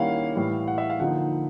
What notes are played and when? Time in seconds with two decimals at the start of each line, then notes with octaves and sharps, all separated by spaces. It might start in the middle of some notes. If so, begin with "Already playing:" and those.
Already playing: D#3 G3 A#3 C#4 E4 F5 F#5
0.35 A2 E3 G3
0.68 F#5
0.78 E5
0.90 F5
1.00 D3 F3 A#3 D#4 F#5